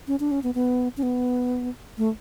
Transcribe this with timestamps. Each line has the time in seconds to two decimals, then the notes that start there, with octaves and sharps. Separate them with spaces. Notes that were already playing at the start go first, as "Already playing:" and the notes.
0.08 C#4
0.20 D4
0.31 C#4
0.43 B3
0.55 B3
0.97 C#4
1.03 B3
1.98 A3